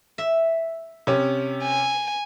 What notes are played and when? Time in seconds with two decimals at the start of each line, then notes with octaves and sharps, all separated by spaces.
0.18 E5
1.07 C3 C#4
1.63 G#5